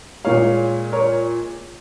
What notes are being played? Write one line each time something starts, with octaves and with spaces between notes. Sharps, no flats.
A#2 G#3 C#5 F5
A#4 C#5